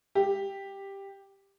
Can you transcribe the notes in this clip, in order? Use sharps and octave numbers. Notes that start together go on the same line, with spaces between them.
G4